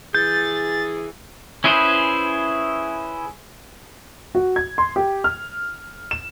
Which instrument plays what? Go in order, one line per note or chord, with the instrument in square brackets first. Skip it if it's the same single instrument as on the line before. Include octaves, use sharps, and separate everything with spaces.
[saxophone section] E3 G#4 [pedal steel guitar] G6 [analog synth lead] A6
[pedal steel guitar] C#4 E4 G#4 B4 C5
[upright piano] F#4
G#6
C6
G4
F6
E7